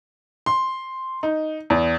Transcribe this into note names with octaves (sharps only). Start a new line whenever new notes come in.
C6
D#4
E2